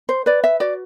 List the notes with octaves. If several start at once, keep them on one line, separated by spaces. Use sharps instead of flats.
C5
B4 D5
E5
F#4 D5